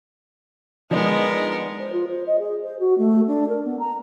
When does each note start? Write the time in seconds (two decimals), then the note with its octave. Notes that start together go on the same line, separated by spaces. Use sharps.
0.91 F3 G#3 B3 D4 D#4 A#4
1.80 C5
1.93 F4
2.07 C5
2.27 D#5
2.39 G#4
2.64 C5
2.80 F#4
2.98 A3
3.27 D4
3.49 A#4
3.65 B3
3.79 A#5